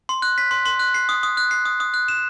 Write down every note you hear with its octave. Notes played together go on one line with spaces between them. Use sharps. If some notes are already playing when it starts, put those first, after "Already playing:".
C6
F#6
B6
C6
C6
F#6
C7
D#6
D#6
F#6
C7
D#6
D#6
F#6
E7